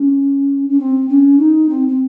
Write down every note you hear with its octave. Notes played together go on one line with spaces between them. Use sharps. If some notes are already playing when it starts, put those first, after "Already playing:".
Already playing: C#4
C#4
C4
C#4
D#4
C4
C4